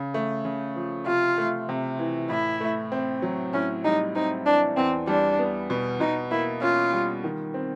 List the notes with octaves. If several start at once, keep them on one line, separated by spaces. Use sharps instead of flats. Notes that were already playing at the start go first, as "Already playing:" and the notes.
Already playing: C#3
A3
C#3
F3
C3 F4
A3
C3
E3
A2 E4
A3
C4
F#3
A2 C#4
G3 D#4
C4 D#4
E3 D4
E2 C4
G3 D4
B3
B2
B2 D#4
A#3 E4
C#4 F4
G3
D#3
C4